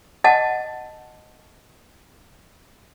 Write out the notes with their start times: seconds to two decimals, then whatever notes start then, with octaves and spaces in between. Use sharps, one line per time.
0.24 D#5 F#5 A5